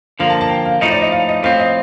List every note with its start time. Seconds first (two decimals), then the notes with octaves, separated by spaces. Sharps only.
0.20 D3 F3 A#3 F5
0.30 A5
0.41 A5
0.50 G5
0.65 F5
0.81 A2 F3 A3 D#4 D#5
0.91 D5
1.02 D#5
1.12 F5
1.29 D#5
1.43 A2 F3 C4 F5
1.60 D#5